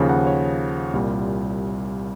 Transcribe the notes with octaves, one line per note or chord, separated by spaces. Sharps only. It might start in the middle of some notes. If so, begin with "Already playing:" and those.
Already playing: D#2 C#3 F3
F#5
C#5
C2 A#2 G3